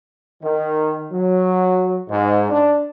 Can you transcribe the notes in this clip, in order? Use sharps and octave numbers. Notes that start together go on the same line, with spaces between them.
D#3
F#3
G#2
D4